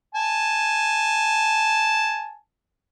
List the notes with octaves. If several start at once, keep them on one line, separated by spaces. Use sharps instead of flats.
G#5 A5